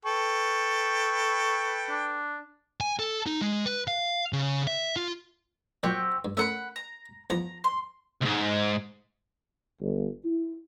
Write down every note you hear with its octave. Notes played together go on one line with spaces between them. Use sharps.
A4 B4 G5 C#6
D4
G#5
A4
D#4
G#3
B4
F5
C#3
E5
F4
A#2 F#3 C4 F#4 G4
G2
A3 C#4 A#4 E5 F#5 B5
A#5
E2 F3 A#5
C6
C#2 G#2
G1
E4